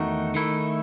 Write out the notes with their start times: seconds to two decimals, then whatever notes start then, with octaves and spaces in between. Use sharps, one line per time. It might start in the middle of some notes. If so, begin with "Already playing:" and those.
Already playing: E2 D#3 A3 D#4 F#4
0.35 D#3 A3 E4